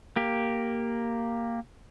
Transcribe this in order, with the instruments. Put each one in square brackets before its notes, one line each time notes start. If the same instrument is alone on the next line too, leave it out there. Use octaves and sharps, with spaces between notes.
[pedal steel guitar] A#3 G4